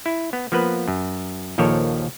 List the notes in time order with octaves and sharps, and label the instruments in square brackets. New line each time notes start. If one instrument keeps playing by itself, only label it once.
[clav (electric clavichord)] E4
B3
F3 A#3 B3 B4
F#2
A#1 D#2 F3 A4 A#4 C#5